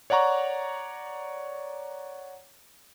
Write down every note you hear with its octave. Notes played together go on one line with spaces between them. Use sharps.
C#5 D5 F#5 A#5 C#6